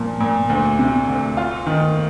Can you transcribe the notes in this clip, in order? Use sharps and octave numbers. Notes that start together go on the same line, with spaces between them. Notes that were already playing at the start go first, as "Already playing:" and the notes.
Already playing: A#2 F3
A#2
D2
C3
D2
F4
D#3